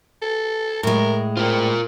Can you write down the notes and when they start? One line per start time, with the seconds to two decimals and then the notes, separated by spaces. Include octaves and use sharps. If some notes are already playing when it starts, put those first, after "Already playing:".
0.22 A4
0.83 A2 G#3 A#4
1.37 C4 F4 A#4